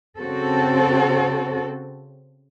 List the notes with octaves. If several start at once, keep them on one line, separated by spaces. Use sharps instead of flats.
C#3 C4 F#4 A4